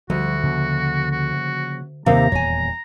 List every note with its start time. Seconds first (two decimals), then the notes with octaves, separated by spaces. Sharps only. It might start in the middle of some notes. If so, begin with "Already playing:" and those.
0.10 D2 F3 G3 F#4
0.43 C#3 F3 A#3
1.11 F#4
2.06 D#2 C3 F5 A#5
2.32 D#1 E2 C#5 G#5